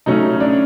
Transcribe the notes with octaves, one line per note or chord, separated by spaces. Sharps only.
C#3 F#3 A3 C#4 D#4
D4